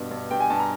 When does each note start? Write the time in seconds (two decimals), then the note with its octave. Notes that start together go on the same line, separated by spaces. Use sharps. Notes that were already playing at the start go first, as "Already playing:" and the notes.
Already playing: G2 B2
0.11 G2
0.31 G2 G5
0.40 G#5
0.50 G2 A5
0.60 A#5